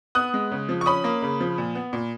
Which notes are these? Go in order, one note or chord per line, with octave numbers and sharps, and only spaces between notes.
B3 D#6 F#6
G#3
C#3
F3
C#6
C#4 B5 D#6
A#3
C#3
F3
A#2
B3
A#2